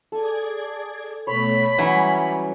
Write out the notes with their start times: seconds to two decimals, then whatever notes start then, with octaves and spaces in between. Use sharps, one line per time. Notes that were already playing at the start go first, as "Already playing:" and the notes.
0.12 G#4 A4 D5 G#6
1.27 B2 A3 C#5 B5
1.78 E3 F#3 G3 C#4